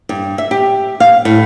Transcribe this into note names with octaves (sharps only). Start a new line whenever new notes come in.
G2
E5
G4
F5
A2